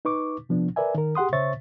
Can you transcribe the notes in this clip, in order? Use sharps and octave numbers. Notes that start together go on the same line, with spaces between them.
D#4 B4 C#6 D6
C3 F3 B3 D4
A#4 B4 D5 E5 G#5
D#3 A#4
G4 G#4 F#5 C6 D#6
C#3 C5 C#5 E5 C#6 A6